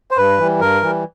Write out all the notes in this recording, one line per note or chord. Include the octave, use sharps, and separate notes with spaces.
C5
G2 B4
E3 G3
G2 A#4
E3 G3